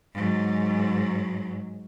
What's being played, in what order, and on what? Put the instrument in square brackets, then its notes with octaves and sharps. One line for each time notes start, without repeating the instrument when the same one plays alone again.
[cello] G#2 F#3